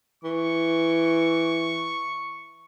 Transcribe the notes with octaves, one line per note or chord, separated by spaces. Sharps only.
E3 C#6